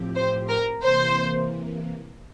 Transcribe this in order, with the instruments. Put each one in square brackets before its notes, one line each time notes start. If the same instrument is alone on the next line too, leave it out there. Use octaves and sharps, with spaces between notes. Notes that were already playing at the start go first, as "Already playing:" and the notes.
Already playing: [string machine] A2 F3 C4 G4
[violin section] C5
A#4
[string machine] C3 E3 A#3 [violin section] C5